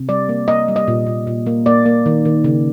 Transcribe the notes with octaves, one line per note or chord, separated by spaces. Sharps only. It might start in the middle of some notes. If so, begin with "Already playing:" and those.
Already playing: C3
G3 D5
A#3
A#3 D#5
G3
D#5
A#2
A#2
A#2
A#3
A#3 D5
A#3
D#3
D#3
C#3